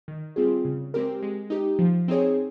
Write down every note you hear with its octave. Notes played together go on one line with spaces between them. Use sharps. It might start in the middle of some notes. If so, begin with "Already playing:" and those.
D#3
G3 C4 F4 G#4
C#3
G#3 C4 G4 A#4
G#3
D#4 G4
F3
C4 D#4 G#4 C#5